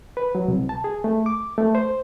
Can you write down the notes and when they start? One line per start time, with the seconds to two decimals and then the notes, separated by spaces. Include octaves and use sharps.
0.17 B4
0.35 F#3
0.48 C2
0.69 A5
0.84 G#4
1.04 A3
1.26 D6
1.58 A3
1.75 C5